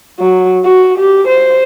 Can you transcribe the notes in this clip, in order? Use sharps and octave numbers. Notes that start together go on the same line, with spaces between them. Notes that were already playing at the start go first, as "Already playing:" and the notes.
F#3
F#4
G4
C5